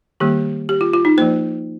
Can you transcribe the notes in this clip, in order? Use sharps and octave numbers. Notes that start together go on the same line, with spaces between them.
D#3 G3 A#3 G4
G4
F4
F4
D#4
F3 A#3 C5